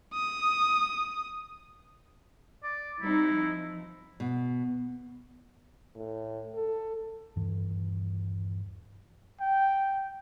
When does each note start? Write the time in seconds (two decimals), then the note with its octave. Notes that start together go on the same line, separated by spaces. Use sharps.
0.13 D#6
2.64 D5
3.00 G3 C4 D#4 E4
3.35 F3
4.20 B2
5.96 A2
6.55 A4
7.36 D#1 G2 E3
9.41 G5